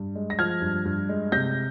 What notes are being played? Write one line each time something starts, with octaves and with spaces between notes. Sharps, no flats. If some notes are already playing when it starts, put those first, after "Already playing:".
Already playing: G2
G#3
A#6
F3 F6 G#6
G2
G2
G#3
C3 G6 A#6